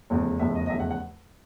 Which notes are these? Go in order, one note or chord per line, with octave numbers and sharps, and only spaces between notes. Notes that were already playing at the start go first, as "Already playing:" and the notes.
F1 E2 C#3
F1 E2 C#3 E5
D#5
D#5
F1 E2 C#3 E5
F#5
F#5